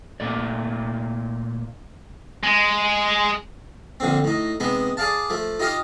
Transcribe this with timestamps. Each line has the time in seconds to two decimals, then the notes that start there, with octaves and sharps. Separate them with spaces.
0.20 A#2 A3 D5
2.43 G#3
4.00 A#1 D3 C4
4.24 A2 D#4
4.60 C3 G#3 B3 D#4
4.97 G#4 D5 F5 A5
5.30 F3 A3
5.59 D#4 F4 G4 D#5 F5